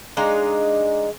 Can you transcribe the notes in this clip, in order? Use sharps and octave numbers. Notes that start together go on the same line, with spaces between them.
G#3 D4 D#4 F5